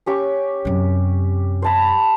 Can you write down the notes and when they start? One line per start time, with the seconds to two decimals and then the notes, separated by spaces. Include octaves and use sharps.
0.06 C#4 G4 C#6
0.65 F#2 C3
1.62 C5 A5 B5